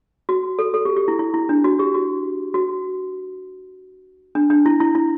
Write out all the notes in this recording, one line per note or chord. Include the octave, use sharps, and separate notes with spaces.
F#4
A4
A4
G4
G4
E4
E4
E4
D4
F#4
G4
F#4
F#4
D4
D4
E4
E4
E4